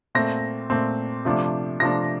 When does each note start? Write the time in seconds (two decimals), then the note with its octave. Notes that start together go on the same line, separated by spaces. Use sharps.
0.15 A#2 A3 C4 A#6
0.70 A#2 A3 C4
1.25 C3 F3 A3 D4
1.80 C3 F3 A3 D4 A#6